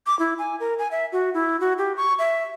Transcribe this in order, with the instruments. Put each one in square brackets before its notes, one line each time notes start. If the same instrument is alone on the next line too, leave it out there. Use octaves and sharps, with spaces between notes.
[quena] D6
E4
G#5
A#4
G#5
E5
F#4
E4
F#4
G4
C#6
E5